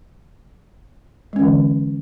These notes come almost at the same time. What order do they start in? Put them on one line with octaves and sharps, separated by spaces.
G#3 C#4 E3 D3